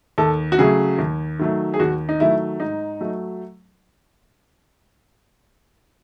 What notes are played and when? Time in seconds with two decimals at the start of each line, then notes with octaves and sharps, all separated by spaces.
0.18 D#2 A4
0.52 F#4
0.58 C#3 F#3 A3 G#4
0.99 D#2
1.39 D#3 F#3 A3
1.74 G#4
1.79 D#2 F#4
2.09 D#4
2.20 D#3 F#3 A3 E4
2.60 G#2 D#4
3.00 F#3 A3